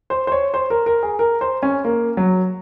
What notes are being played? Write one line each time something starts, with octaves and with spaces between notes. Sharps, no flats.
C5
C5
C#5
C5
A#4
A#4
G#4
A#4
C5
C#4
A#3
F#3